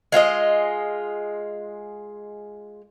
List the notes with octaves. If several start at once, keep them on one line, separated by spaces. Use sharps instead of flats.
G#3 F4 F#4 D#5